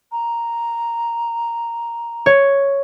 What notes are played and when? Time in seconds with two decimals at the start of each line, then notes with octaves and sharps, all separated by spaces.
0.12 A#5
2.26 C#5